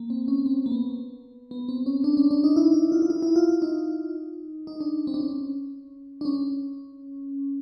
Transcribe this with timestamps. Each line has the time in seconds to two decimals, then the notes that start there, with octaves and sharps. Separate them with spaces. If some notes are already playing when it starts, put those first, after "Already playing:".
Already playing: A#3
0.10 C4
0.28 C#4
0.46 C4
0.66 A#3
0.72 B3
1.51 B3
1.69 C4
1.86 C#4
2.04 D4
2.17 C#4
2.31 D4
2.44 D#4
2.56 E4
2.74 E4
2.92 F4
3.02 F4
3.10 E4
3.22 E4
3.36 F4
3.49 E4
3.62 D#4
4.67 D#4
4.81 D4
5.07 C4
5.14 D4
5.20 C#4
6.21 D4
6.25 C#4